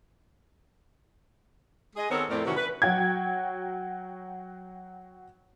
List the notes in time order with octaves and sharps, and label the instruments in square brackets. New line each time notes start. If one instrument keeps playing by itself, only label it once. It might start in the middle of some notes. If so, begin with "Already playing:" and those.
[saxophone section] G#3 G#4 D#5
D#3 B3 C4 A4 A#4 C#5
F2 A2 A3 C4 A#4 D5
C3 D#3 E3 C#4 F#4
B4
[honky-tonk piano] F#3 F#4 G5 G#6